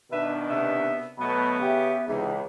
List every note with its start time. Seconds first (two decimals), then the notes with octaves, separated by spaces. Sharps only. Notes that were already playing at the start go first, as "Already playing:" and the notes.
0.11 B2 D#3 D4 B4 E5
0.48 C3 B3 E5
1.18 B2 F#3 A3 B3 B5
1.60 C#3 G4 E5
2.08 C#2 C3 E3 D#4 G#4